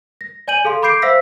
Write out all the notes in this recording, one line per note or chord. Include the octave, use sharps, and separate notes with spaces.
A#6
D5 G#5 G6 D#7 F#7
G#4 A4 F5 C6
B5 D6 G6 C7 D7
C5 E5 F5 E6 A#6 B6